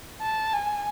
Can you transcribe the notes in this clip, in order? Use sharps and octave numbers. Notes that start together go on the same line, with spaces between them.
A5
G#5